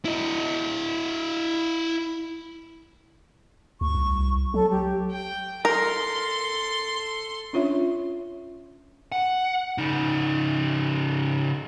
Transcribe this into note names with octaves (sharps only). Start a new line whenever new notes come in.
E4 D#5
D2 C#6
C2
F#3 A4
G4
G5
A4 A#4 C6
C#4 D4 F4 C#5 E5
F#5
C#3 D#4